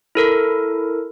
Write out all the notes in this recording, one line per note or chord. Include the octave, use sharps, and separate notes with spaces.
E4 A4 A#4